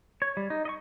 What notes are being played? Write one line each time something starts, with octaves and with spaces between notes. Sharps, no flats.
C#5
G3
D#4
D#5 C#6